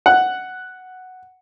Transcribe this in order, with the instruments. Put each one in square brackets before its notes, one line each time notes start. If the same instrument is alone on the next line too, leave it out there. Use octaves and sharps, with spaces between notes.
[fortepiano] F#5